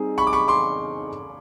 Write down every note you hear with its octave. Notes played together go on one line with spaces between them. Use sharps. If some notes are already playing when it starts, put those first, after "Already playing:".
Already playing: G3 C4 D#4 G#4
B5 C#6
D6
B5 C#6
C6 D6